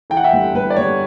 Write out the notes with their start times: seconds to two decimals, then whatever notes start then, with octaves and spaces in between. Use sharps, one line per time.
0.10 E3 G5
0.17 F#5
0.24 E5 G5
0.33 G1
0.54 G1 B4
0.70 D5
0.76 G1 C#5